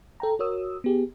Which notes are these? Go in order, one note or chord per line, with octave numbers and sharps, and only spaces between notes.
A4 G5 A#5
F#4 A#4 C#5 D#6 E6
B3 G4 G#4